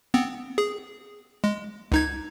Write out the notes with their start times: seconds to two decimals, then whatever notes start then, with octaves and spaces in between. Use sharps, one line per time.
0.14 B3 C4
0.58 G#4
1.44 G#3
1.92 C#2 D#4 G#6